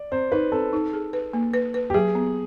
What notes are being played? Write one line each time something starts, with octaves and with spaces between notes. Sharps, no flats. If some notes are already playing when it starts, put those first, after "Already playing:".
Already playing: D5
C4 C5
D#4 B4
C4 A4
D#4
G#4
B4
A#3
B4
B4
G4
F#3 G#4
B3